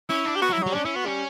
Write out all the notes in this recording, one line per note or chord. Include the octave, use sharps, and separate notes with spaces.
C#4 E4
D4
G4
B3 F#4
F#3
E4
F#3 G3
C#4 D4
C#4 E4
B3 F#4
G3 C#4